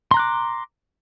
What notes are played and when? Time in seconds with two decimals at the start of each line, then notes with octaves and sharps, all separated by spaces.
0.11 C6
0.14 A#5
0.17 F#6
0.19 D6